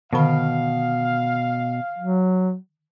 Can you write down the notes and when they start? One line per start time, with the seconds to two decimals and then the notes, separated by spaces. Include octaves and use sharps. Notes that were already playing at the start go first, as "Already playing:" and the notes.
0.13 B2 D3 D#3 F5 B5
1.98 F#3